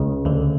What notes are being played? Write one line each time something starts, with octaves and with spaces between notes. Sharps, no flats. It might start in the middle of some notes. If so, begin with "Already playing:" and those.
Already playing: C#2 C#3
D2 D3